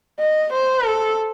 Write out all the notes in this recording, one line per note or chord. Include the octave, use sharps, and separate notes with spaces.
D#5
C5
A4